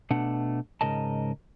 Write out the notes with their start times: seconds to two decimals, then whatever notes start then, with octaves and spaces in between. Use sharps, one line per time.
0.10 B2 A3 D4 F#5
0.81 G#2 C#3 A#4 D#5 A5